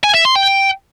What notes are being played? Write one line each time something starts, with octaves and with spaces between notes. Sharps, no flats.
G#5
E5
C6
G5